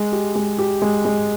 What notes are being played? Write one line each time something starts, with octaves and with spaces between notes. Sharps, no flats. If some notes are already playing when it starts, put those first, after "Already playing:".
Already playing: G#3
G4
G#3
G4
G#3
G#3